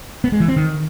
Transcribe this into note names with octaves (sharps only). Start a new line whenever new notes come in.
B3
G#3
E3
C4
D#3